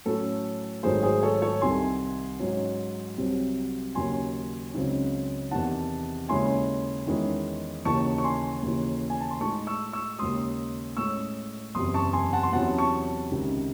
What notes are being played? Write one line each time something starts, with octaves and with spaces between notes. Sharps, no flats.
A2 F#3 C#4 A4
G#1 G#2 D#3 F#3 A3 G#4 C5
G#4 C5
A4 C#5
A4 C#5
C2 C3 D#3 G#5 C6
G#2 F#3 C#4
C2 C3 F#3 C4
D#2 C#3 F#3 C#4 G#5 C6
C#2 C#3 F#3 C4 D#4
E2 C3 D#3 F#5 A5
D#2 C#3 G#3 C#4 E4 G#5 C6
E2 D#3 G#3 C#4 E4
D#2 C#3 E3 A5 C#6
C#6
G#5 C6
D#2 C#3 E3
G#5
A5
C6
A2 G#3 D#4 A5 C#6
C#6 E6
C#6 E6
D#2 C#3 G#3 C6 D#6
A2 G#3 C#4 C#6 E6
F#1 E2 C3 C6 D#6
A5 C#6
G#5 C6
F#5 A5
C6
E2 C3 F#3 C#4 E4 F#5 A5
A5 C#6
C#2 C3 D#3